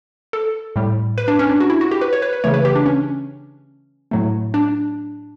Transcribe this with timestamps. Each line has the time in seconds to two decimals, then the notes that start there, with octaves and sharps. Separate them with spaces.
0.33 A4
0.76 A2 G3
1.18 B4
1.28 D4
1.39 C#4
1.49 D4
1.60 F#4
1.70 E4
1.81 F#4
1.91 G4
2.01 B4
2.13 C#5
2.22 B4
2.33 B4
2.44 C#3 E3 A3 C#5
2.54 B4
2.65 G4
2.75 D4
2.86 C#4
4.11 A2 F#3 A3
4.54 D4